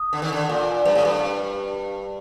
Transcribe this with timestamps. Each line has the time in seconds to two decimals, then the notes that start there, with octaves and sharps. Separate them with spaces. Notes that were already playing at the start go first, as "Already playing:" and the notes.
Already playing: D#6
0.13 D3
0.22 D#3
0.33 D3
0.49 A#2
0.85 G2
0.95 A2
1.05 G2